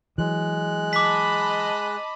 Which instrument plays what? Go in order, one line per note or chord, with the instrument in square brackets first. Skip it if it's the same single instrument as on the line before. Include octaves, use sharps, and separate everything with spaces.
[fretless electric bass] E3 F#3 [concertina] G#3 F#6
[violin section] D#5 A5 B5 [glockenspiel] D6 B6